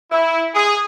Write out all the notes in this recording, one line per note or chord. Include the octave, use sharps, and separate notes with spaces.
E4
G#4